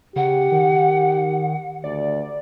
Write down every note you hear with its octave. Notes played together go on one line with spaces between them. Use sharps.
C#3 G4 F#5
D#3
D2 D5